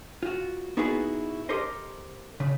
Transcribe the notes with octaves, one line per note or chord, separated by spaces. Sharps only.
F4 F#4
B3 D#4 E4 F#4 G#4 B4
G4 A4 A#4 C5 D#5
C#3